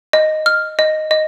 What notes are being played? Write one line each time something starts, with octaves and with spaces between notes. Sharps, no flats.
D#5
F6
D#5
D#5